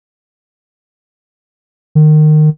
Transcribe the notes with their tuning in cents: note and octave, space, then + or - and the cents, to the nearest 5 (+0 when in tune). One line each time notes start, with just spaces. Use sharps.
D#3 -25